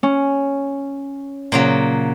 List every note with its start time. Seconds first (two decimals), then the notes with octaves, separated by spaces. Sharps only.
0.03 C#4
1.52 A#2 C#3 F#3